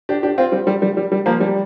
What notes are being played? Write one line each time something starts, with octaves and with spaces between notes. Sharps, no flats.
D4 G4
D4 G4
C4 F4
G3 C4
G3
G3
G3
G3
F3 A#3
G3